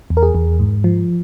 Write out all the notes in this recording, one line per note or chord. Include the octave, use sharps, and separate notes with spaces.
E2
A#4
G#4
E2
G#2
F3